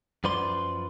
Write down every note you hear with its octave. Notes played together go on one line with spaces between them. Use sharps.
F#2 F3 B4 D5 C6